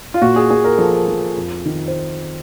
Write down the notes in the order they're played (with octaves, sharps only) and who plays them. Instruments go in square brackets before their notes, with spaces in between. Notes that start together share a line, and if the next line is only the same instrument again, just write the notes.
[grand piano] F4
A#2 F#4
G#4
A#2 G#4
A#4
F3 A4
A#4
F3
F2
D#3
C5